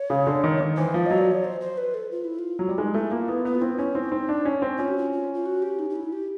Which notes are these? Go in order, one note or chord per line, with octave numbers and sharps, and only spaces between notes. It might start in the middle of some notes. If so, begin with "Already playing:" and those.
Already playing: C#5
C#3
D3
D#3
D#3
E3 C5
F3
F#3 D#5
D5
C#5
C5
C5
B4
A4
F4
E4
F4
F#3
G3
G#3 D#4
A3 E4
A#3 F4
B3 E4
B3 E4
F4
C4 E4
C#4 E4
C4 D#4
E4
C4 D#4
D4
C#4
C4
C#4 F4
F#4
F4
F4
F4
F#4
G4
D#4
D#4
E4
G4